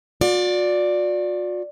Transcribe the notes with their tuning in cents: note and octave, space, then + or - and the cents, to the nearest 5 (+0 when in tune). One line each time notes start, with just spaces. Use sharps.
F#4 -45 D5 +0